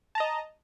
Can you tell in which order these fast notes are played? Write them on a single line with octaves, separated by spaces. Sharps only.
A5 A#5 D#5